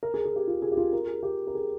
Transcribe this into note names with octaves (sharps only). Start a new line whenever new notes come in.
A#4
G#4
G#4
G4
F4
G#4
G4
F4
A#4
G#4
G4
A#4
G#4